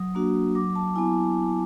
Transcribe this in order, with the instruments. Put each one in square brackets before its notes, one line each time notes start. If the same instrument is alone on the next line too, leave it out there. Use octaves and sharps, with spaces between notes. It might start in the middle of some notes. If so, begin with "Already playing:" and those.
Already playing: [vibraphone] F#3 D#6
A#3 D4 F#4
F#3 D6
A5
B3 E4 G#5